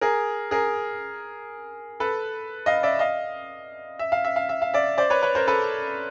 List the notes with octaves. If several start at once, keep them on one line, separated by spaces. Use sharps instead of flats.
G#4 A#4
G#4 A#4
A4 B4
D#5 F5
D5 E5
D#5 F5
E5
F5
E5
F5
E5
F5
D5 E5
C5 D5
B4 C#5
B4 C#5
A#4 C5
A4 B4